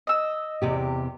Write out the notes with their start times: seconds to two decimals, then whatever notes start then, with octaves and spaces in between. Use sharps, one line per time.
0.07 D#5 E6
0.62 E2 C3 G4